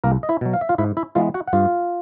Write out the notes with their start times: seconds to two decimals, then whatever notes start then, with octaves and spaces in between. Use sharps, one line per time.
0.04 C2 A#3 A#4
0.23 D#5
0.29 E4 E5
0.41 B2 F#3
0.54 F5
0.61 E5
0.69 F4 F5
0.78 G#2 E4 E5
0.97 E4 E5
1.15 E3 G#3 B3 F4 F5
1.34 F#4 F#5
1.48 F#5
1.53 G2 F4 F5